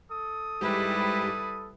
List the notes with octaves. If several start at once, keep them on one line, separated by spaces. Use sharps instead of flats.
A4 D#6
G#2 G3 E4 G4 B4